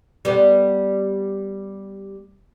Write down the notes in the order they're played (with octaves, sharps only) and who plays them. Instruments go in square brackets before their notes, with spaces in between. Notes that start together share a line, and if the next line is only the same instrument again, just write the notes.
[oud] G3 B3